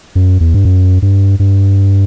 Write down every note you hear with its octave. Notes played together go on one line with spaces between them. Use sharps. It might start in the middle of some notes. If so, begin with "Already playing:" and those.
F#2
E2
G2
F#2
G2
G2